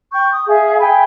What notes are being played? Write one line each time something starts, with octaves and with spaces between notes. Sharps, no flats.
G5 C#6 G6
D#6
G#4 E5 F5 G#5
E5 G5 G#5 B5